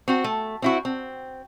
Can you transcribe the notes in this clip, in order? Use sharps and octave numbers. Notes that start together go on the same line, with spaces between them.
C4 F#4
A3
C4 E4 F#4
C4